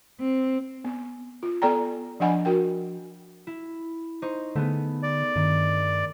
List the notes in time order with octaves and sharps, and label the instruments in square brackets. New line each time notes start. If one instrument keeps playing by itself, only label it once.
[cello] C4
[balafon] B3
F4
B3 A4 D5 G5 A#5
F3 D4 D#5 F#5 G#5 B5
F#4 A#4 G5
[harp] E4
D#4 C5 C#6
[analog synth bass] D3 [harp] A3 B3 G#4
[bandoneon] D5
[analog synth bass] G2 [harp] D#3